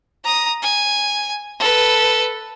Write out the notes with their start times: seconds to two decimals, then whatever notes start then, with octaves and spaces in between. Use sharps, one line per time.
0.24 A#5 D#6
0.62 G#5
1.59 A4 B4